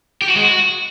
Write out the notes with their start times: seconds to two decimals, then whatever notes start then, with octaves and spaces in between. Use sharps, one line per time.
0.22 G4
0.29 F#4
0.36 G#3
0.42 F#4